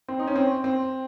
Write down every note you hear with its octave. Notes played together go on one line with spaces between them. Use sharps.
C4
D#4
C#4
C4
C4